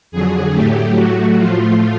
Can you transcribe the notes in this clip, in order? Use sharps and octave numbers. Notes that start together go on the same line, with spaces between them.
F2 D3 F#3 G#4
A2 F#3 A3 G4
A2 F#3 A3 F#4
A2 F3 A3 F4